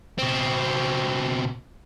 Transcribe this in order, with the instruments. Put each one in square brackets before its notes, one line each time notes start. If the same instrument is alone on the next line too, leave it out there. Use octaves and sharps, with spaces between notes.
[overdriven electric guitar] B2 C4